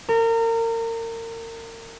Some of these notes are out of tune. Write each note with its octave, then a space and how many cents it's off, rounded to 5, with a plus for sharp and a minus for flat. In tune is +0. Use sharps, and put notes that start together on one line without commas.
A#4 -30